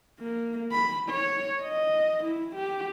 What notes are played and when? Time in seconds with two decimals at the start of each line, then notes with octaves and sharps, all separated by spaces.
0.19 A#3
0.72 B5
1.10 C#5
1.62 D#5
2.24 E4
2.56 G4